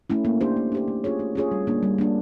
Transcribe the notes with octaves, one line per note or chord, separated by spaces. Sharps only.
A3 C#4 E4
A#3
D4 G4 C5
A#3
D4 G4 C5
A3
C#4 F4 G#4 C#5
A3
C#4 F4 G#4 C#5
G3
A#3 D4
G3
A#3 D4